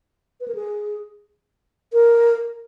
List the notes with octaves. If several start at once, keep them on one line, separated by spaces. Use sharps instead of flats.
B4
A#4
G#4
A#4